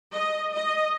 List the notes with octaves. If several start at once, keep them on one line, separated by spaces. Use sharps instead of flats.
D#5
D#5